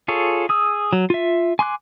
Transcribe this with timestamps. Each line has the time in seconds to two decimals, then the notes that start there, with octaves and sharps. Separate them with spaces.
0.08 F4 G#4 A4 C#5
0.49 G#4 D#6 E6
0.93 F#3
1.10 F4 E5
1.59 G#5 C6 D6 F#6